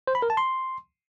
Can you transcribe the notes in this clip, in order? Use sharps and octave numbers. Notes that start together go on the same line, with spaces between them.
C5
B5
A#4
A5
C6